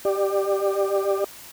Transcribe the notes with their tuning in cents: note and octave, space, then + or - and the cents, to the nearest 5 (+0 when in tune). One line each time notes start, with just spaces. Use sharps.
G4 +0 D5 +25